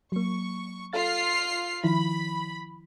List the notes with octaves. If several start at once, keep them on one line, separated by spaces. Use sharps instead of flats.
F#3 A#3 C#6
F4 A4 F5 F6 A6 C7
D#3 F3 E4 B5